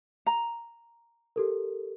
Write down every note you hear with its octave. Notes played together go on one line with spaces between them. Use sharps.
A#5
G4 A4 A#4